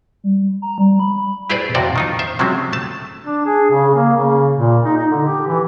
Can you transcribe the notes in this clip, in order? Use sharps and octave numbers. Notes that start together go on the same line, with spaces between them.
G3
A#5
G3
B5
E4 G4 G#4 B4 C5 D5
F2 C3 F#4 D5 G5
D#3 D#4 F4
C5 E5
C3 F3 F#3 G#3 C4 C#4
A3 A5
D4
G#4
C#3
A#3
C#3
A#2
D#4
D#4
D3
G4
E3